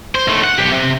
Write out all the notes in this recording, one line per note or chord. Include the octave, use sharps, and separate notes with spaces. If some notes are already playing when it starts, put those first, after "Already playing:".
C5
D#2 A3
F#5
B1 G4
C3